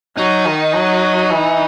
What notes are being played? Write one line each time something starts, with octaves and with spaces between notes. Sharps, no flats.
F#3 D#4
D#3
F#3
E3